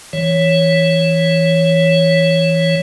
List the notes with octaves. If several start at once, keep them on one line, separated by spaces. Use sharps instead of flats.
E3 C#5